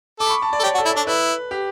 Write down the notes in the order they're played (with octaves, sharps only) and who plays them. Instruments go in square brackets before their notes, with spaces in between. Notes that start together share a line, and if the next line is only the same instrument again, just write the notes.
[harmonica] A4 [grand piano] D6
[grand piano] B5
C#6
A5
D5
[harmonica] A4
[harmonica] G4 [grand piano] C#5
[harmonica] F#4
[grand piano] A4
[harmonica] E4
[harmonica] D4 [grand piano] A4
[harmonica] E4 [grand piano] B4
[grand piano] G4